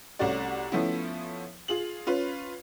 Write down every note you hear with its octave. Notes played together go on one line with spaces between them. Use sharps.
C2 A3 C#4 F#4 D5
F3 A3 B3 C#4 E4
F4 G#4 F#7
C#4 F4 B4